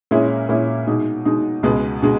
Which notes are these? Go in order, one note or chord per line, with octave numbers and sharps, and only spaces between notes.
A#2 G#3 C#4 E4
A#2 G#3 C#4 E4
B2 G#3 D#4
B2 G#3 D#4
C#2 B2 G#3 B3
B2 G#3